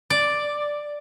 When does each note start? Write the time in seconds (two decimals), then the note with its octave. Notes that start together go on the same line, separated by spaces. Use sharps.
0.10 D5